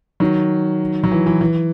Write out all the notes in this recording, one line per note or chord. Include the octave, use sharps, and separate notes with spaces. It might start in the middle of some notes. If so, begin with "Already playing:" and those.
D#3 F#3
F#3
E3
E3
E3